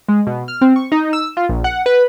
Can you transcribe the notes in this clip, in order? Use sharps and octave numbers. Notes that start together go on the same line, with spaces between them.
G#3
B2
F6
C4
C#6
D#4
E6
F4
A#1
F#5
B4